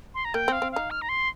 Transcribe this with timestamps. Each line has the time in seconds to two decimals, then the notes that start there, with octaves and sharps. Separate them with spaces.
0.14 C6
0.25 A#5
0.34 A#3 G5
0.48 C4 F5
0.62 C4
0.72 D#4 F5
0.91 F6
1.02 A#5
1.09 C6